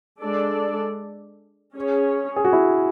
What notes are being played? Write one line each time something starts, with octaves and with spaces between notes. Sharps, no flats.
G#3 D4 A4 D5
C#4 G#4 C#5
G#4
F#4
E4